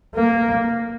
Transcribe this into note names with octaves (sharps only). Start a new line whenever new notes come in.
A#3